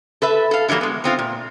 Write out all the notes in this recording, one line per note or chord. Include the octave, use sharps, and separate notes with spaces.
A4 B4 E5
A4 F5
D3 E3 F#3 G3 A#3
G#3 B3
B3 C4 F4
A#2